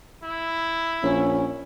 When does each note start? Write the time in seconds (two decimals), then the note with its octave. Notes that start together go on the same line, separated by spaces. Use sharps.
0.23 E4
1.03 A#1 C#4